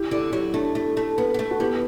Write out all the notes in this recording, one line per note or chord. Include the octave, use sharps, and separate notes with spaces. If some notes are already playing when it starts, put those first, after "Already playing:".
Already playing: E4 G4
D3 E4 G4
F#3 E4 G4
A3 D4
A3 E4
A3
B3
B3
A3
F#4
B3 E4 G4